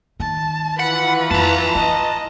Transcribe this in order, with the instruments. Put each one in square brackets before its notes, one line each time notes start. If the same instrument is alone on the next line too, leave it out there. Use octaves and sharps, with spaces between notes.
[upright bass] D#3 [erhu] A5
[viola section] E3 F4 B4 [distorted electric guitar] F#5 [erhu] B5
[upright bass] F2 [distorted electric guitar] A5 A#5
[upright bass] D#4 [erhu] D#5